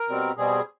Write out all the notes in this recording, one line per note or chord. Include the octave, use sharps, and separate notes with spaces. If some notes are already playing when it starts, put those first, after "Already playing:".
Already playing: A#4
B2 G3 C4
B2 G3 C4 G#4